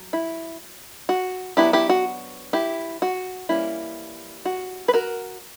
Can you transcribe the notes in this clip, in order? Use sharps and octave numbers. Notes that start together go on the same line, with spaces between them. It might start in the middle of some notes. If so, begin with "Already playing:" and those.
Already playing: F#3
E4
F#4
F#3 B3 D4 E4 G4
E4 G4
F#4
E4 G4
F#4
E3 G3 A#3 C#4 E4
F#4
B4
F#4 A#4